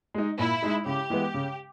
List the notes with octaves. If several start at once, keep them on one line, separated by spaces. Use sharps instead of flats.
G#3 D#4
A#2 E4
G#3 D#4
C#3 G4
E3 G#3 B3
C#3